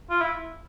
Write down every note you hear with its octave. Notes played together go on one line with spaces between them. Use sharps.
F4
E4